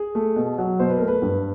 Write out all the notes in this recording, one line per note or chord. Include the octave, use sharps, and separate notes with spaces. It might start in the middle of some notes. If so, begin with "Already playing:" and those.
Already playing: G#4
A3
B2
F#3
B2 C5
B4
A3 A#4
B4
G2